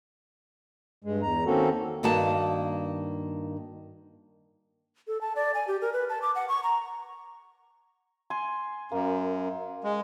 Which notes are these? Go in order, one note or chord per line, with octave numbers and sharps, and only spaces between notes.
G2 G#3
E2 A#5
D#3 A#3 C4 C#4 F#4 A4
G2 D#3 A#3 F#4 F5 A5
A4
A5
D5
G#5
G4
A#4
B4
A5
D6
F#5
C#6
A#5
G#5 C6
F#2 A#3
G#3